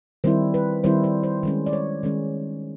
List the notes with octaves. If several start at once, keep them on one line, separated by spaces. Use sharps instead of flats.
D#3 G3 C4 E4 C5
B4
D#3 G3 C4 E4 C5
C5
C5
D#3 G#3 C#4
D5
C#5
D#3 G#3 C#4